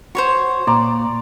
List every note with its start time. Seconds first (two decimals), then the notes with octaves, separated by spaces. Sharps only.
0.15 F#4 C5 C#5 C#6
0.67 A#2 D5 A#5 C6